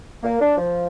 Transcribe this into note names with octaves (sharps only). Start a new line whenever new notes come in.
A#3
D4
F3